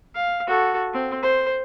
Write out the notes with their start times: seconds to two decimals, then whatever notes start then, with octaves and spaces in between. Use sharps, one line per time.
0.15 F5
0.47 F#4 A4
0.93 C4
1.22 C5